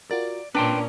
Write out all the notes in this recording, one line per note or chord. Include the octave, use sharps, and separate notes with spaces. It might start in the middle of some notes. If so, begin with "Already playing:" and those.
F4 F#4 A#4 D5
A#2 A#3 C#4 D4 B4 G5 A#5 C6